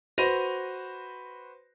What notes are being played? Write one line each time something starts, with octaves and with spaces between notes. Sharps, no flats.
F#4 B4 C5 A#6 D#7 F7